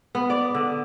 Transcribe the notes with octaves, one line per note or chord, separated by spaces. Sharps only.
B3
D5
D3